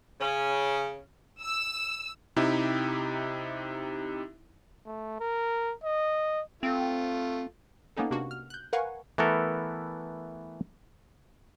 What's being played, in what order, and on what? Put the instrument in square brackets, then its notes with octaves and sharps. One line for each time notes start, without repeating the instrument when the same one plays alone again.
[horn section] C#3 C#4
[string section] E6
[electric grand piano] C3 D#4 E4 G4
[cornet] A3
A#4
D#5
[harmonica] A3 F4 [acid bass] C4
[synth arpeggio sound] A#3 B3 C#4 D#4 A4
C3 A#3 D4 F#4
F6
F#6 G6
A#4 B4 F5 F#5 G#5 C#6
[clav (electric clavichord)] E3 A3 B3 A4 A#4